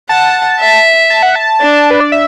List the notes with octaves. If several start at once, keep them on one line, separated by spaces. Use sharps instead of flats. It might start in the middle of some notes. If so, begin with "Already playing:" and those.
F#5 A5
E5
A5
F#5
A5
D4
B4
D5
E5